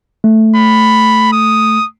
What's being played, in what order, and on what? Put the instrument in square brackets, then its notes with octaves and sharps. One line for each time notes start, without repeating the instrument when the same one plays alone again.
[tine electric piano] A3
[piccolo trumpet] B5
D#6